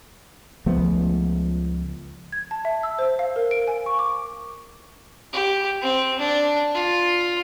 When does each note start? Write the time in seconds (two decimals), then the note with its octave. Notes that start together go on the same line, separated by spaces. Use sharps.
0.66 C#2 F3 A3 B3
2.32 G#6
2.51 A5
2.65 E5
2.83 E6
2.99 C5
3.19 F5
3.36 A#4
3.51 D7
3.68 G#5
3.86 C#6
3.99 D6
5.33 G4
5.81 C4
6.19 D4
6.74 F4